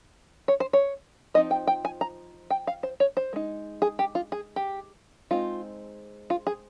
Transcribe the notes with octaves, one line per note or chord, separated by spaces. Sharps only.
C#5
C5
C#5
F3 C4 D#4 D#5
G5
G5
G#5
A#5
G5
F5
C5
C#5
C5
G#3 D#4
G#4
G4
F4
G#4
G4
G#3 C4 D#4 F4
F4
G#4